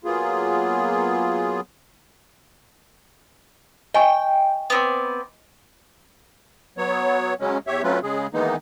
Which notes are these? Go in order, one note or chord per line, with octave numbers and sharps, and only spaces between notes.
F#3 A#3 B3 F4 G#4
D#5 G5 G#5 C#6
B3 C4 D5
F#3 B3 C#5
C#3 F#3 G#3 C#4
E2 G4 C#5 E5
F#3 A3 C4 C#4 F4 B4
C#3 G#3 G#4
D#3 E3 G#3 A#3 B3 D#4